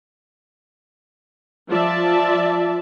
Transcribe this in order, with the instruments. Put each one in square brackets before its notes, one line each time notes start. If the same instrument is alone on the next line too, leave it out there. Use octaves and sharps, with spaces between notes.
[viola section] F3 F4 D5 E5 A5